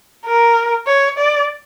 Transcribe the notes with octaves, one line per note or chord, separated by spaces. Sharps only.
A#4
C#5
D5